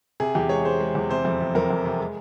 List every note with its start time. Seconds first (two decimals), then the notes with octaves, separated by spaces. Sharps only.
0.20 C3 G#4
0.35 E2 G4
0.49 G#3 C#5
0.65 G#3 C5
0.80 G#3
0.95 E2
1.10 C3 C5
1.25 F2
1.41 C3
1.55 F2 A#4
1.70 F2
1.85 C3
2.00 G#3